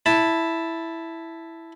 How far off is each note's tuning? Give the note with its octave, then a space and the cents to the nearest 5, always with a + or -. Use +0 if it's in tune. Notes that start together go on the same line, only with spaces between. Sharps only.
E4 +0 A5 +0